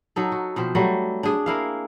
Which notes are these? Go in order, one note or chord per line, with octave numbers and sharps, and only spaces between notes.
F#3 D#4 A4
F#4
B2 F3 C4
F#3 G3 A3
D4 G#4
A#3 E4 F5